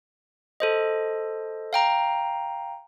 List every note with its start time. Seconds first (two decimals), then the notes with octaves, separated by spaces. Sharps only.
0.60 A4 C5 D#5
1.73 F5 G5 A#5